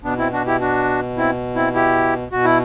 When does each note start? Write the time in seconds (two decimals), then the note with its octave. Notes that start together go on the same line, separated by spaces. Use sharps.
0.04 B2 B3 D4
0.18 C4 E4
0.33 D4 F#4
0.47 E4 G4
0.61 D4 F#4
1.17 C4 E4
1.55 C4 E4
1.74 E4 G4
2.32 B2 F#4
2.45 E4